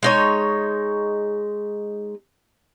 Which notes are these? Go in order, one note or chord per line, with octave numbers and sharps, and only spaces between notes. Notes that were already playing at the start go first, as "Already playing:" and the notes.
G#3 D#4 C#5